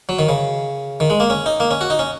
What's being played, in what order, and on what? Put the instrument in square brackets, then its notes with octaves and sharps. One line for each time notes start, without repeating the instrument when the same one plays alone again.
[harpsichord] F#3
D#3
C#3
D#3
G#3
A#3
C#4
D#4
A#3
C#4
F#4
D#4
C#4